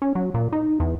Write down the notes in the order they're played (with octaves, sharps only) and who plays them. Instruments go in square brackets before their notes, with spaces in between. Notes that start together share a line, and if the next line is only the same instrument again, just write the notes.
[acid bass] C#4
F#3
A#2
D#4
E2